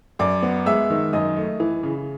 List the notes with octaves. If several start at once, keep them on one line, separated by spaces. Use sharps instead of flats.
F#2 D5 D6
B3
G#3 E5 E6
D#3
F#2 D#5 D#6
A3
E3
C#3